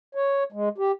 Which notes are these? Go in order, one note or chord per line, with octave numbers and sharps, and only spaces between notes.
C#5
G#3
G4